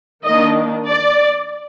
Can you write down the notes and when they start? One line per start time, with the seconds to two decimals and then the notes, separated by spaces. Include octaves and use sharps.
0.25 D#3 A#3 D4 D#5
0.89 D5